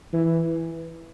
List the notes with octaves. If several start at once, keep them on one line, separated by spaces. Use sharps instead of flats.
E3